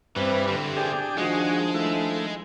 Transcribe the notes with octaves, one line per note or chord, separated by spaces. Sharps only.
G2 E3 C4 B4
D3 E3 C4 G4
D4 G#4 G5
D#3 F3 G#3 D4 F#4 G#4 D#5
A3 E4